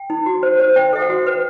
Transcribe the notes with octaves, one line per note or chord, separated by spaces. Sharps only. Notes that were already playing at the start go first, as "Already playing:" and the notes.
Already playing: G5
D#4
F#4
C5
C5
C5 G5
A4 E5
F#5
F#4
B4